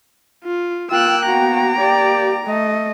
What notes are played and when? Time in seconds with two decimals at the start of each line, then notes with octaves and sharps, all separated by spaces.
0.45 F4
0.91 A#3 F4 G5 E6 F#6
1.26 B3 F#4 A#5
1.80 G4 D5
2.44 A3 D#5